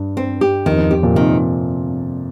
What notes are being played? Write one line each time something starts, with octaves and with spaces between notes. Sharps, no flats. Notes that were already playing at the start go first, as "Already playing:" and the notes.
Already playing: G2
C4
G4
F2 D#3
F2
F2 G4
F2 A#2
C3 D#3